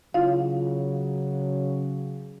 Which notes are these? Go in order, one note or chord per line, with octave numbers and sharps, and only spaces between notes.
C#3 F#3 E4 F4 F5